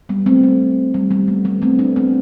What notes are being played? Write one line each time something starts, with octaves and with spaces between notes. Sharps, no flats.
G3 B3
A3 C4
A3
G3
G3 B3
A3
G3 B3
A3 C4
B3 D4
A3 C4